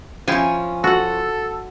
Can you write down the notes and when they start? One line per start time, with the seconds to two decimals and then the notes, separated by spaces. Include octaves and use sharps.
0.28 F3 C#4 E4 G5 G#5
0.84 F#4 A4 F#5